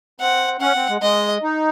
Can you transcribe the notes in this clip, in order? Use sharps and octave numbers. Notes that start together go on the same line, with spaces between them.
C4 F#5
C#4 F#5
C4
G#3
G#3 D#5
D#4